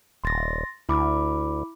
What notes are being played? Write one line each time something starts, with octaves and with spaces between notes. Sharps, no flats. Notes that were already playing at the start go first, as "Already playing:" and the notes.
D#1 C6 A6 A#6
D2 E4 B5 D6